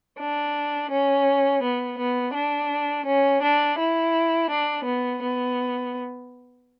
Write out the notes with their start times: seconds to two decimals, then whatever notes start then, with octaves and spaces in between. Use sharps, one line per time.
0.19 D4
0.91 C#4
1.62 B3
1.98 B3
2.34 D4
3.06 C#4
3.42 D4
3.78 E4
4.49 D4
4.85 B3
5.21 B3